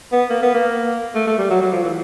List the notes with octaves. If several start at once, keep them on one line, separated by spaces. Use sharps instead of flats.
B3
A#3
B3
A#3
A3
A3
G3
F#3
F#3
F3
E3